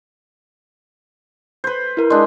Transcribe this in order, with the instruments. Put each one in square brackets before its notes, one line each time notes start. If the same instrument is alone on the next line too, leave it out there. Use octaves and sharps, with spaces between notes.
[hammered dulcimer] B4 C5
[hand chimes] E4 A#4
[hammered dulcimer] G#3 D4 [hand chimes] C6